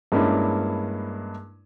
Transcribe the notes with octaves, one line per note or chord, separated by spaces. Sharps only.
G2 G#3 A#3 C#4 D4 E4